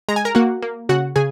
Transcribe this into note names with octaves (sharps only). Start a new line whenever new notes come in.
G#3 A#5
G#5
A#4 A#5
A#3 F#4 F#5
A#3
C#3 F#4 F#5
C#3 G#4 G#5